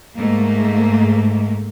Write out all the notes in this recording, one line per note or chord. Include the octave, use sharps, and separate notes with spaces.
G#2 A3 A#3